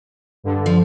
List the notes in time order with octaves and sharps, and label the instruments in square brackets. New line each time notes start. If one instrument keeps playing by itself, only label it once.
[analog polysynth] G2 D3
[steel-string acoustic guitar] F3